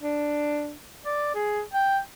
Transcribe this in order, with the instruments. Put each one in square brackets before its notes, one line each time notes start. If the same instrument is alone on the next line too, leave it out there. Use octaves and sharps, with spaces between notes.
[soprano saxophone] D4
D5
G#4
G5